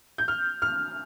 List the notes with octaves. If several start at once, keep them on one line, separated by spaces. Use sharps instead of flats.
G6
F6
F6